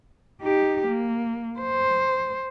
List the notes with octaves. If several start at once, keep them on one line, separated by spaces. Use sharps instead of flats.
D#4 G4
A#3
C5